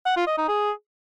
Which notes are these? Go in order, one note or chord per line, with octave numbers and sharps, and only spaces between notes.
F#5
F4
D#5
D#4
G#4